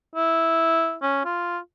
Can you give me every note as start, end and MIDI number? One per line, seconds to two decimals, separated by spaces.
0.15 0.96 64
1.03 1.21 61
1.25 1.58 65